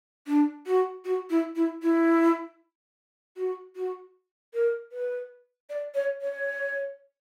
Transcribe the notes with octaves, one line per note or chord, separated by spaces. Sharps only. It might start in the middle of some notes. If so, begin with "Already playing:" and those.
D4
F#4
F#4
E4
E4
E4
F#4
F#4
A#4
B4
D5
C#5
C#5